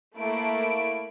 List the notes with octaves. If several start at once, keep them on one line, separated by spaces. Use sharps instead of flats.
A3 A#3 E4 D7